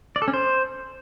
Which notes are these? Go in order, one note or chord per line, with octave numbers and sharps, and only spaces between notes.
D5
A4
C#4
C5